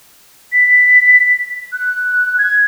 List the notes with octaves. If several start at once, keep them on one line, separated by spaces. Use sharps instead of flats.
B6
F#6
G#6